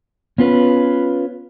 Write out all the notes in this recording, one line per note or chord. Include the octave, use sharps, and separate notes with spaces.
B3 C#4 F4 B4